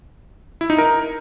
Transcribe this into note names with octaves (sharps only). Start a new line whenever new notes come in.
E4
D#4
A#4